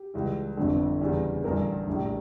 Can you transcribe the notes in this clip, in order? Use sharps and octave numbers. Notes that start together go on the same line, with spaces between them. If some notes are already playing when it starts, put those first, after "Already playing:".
Already playing: G4
C#2 C#3 E3 G3
G1 F2 D3
E2 C#3 E3 G3
A1 G2 D3 G3 A#4
A#1 A2 G3